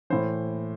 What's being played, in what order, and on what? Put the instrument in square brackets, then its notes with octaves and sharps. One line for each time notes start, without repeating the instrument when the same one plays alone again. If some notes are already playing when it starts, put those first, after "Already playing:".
[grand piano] A2 E3 C5